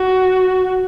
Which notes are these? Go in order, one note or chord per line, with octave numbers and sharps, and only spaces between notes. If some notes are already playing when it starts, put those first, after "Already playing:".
Already playing: F#4